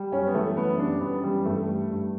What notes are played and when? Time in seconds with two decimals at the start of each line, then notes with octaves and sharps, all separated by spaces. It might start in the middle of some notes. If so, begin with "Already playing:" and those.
Already playing: G3
0.12 F#2 C#4
0.27 B3
0.34 E3 A3
0.56 F#2 B3
0.79 G3 D4
1.01 F#2 B3
1.23 E3 G3
1.45 G2 A3
1.68 G3
1.91 G2